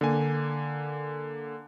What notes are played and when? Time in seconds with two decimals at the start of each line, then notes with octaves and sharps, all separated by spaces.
0.01 D3 A#3 G#5